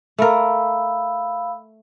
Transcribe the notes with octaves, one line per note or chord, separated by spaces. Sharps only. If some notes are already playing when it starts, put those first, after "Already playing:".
A3 A#4 F5 B5 E6